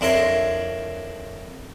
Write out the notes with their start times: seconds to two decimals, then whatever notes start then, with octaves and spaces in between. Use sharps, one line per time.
0.01 F2 D4 E4 A#4 C#5 C6